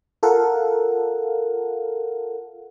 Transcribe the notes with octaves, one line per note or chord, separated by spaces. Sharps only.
F4 A4 A#4 F5 F#5